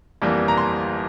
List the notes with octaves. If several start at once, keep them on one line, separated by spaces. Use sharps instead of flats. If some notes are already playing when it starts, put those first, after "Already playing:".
G1 F2 E3 G3 A#3
A#5
C6